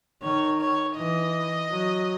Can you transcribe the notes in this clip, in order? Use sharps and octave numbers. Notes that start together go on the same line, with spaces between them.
D#3 C#5
C#5
E3 D#5
F#3